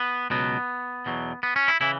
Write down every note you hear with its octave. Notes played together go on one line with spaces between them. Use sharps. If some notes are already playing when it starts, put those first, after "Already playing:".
Already playing: B3
C#2 B2 F#3 B3
E2 B2 F#3
B3
C#4
E4
C#3 E3 E4